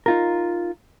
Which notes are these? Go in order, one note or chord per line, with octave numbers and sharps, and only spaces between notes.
D#4 F4 A#4